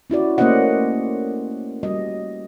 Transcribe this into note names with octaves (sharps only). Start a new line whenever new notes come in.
C#4 E4 F#4 D5
A3 A#3 C#4 C5 D#5 F#5
G3 F#4 D#5